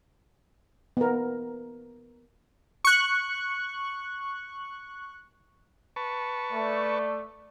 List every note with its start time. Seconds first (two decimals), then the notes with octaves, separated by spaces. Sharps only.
0.97 B3 A#4
2.85 C#6 F#6
5.96 B4 A5 C#6
6.52 A3 D5